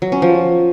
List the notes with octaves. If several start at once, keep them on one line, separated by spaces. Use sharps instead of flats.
F#3
C#4
F3